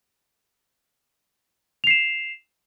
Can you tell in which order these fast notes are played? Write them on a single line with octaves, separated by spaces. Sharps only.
F7 C7 E7